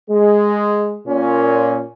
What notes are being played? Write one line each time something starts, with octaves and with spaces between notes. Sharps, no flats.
G#3
A#2 C#4